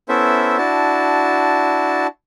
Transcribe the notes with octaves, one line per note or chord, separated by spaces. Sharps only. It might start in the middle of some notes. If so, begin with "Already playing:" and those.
B3 C#4 E4 A4 C5 E5
D4 E4 F#4 A5